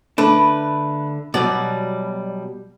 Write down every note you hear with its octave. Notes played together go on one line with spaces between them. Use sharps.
D3 A3 D4 B4
B2 F#3 G3 D5